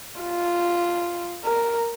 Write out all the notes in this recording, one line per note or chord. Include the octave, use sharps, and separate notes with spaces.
F4
A#4